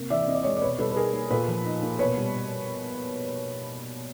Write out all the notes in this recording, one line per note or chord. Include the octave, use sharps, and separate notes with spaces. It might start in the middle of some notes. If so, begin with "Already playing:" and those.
Already playing: C3 A#3
E3 D5 E5
C4 D#5
D5
G#3 C#5 D#5
D5
B2 B4 C#5
G3 A4 B4
B4
D#4 G#4 A#4
A#3
A#2 A4 B4
F3
D#4
A#3
B2 B4 C#5
G3